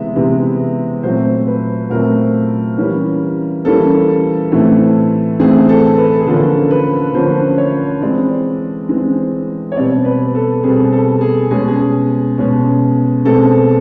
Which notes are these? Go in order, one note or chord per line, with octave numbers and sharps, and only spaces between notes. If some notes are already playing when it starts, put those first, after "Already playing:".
Already playing: C3 E3 G#3 B3 E5
C3 E3 G#3 B3
A#2 F#3 A3 C4 C5
B4
A#2 F#3 A3 C4 A#4
E3 G3 A#3 C#4
E3 G3 A#3 C#4 A4
A2 E3 A3 C4
A2 E3 A3 C4 G#4
A4
B4
G#4
D3 F3 A#3 C#4 A4
B4
D3 F3 A#3 C#4 C5
C#5
E3 G#3 C4 D5
E3 G#3 C4
C#5
B2 G3 C4 D5
B4
A4
B2 G3 C4 G#4
A4
G#4
B2 G#3 C#4 G#4
G#4
B2 G#3 C#4
B2 G#3 C4 A4